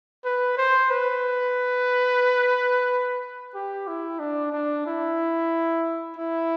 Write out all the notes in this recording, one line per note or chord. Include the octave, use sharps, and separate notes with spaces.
B4
C5
B4
G4
E4
D4
D4
E4
E4